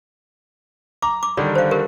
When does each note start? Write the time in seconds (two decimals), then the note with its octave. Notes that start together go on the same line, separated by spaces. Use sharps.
1.02 A#5 D6
1.23 D6
1.37 D3 D#3 G3 D5
1.55 C5 F5
1.71 G4 A#4